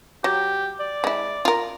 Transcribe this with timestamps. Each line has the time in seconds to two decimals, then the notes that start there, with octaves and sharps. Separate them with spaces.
0.24 F#3 G4
0.80 D5
1.04 G#3 E4
1.45 F4 A#4